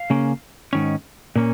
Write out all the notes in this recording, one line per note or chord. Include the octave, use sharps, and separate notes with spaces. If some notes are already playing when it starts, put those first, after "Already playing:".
Already playing: F5
C#3 A#3 C#4
G#2 D#3 C#4
A#2 A#3 C#4